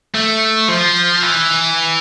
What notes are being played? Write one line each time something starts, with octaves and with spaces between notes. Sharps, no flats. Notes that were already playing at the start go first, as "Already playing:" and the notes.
A3
F3
E3